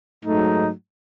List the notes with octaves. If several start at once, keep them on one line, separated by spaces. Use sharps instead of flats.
G#2 F#3 A3 D#4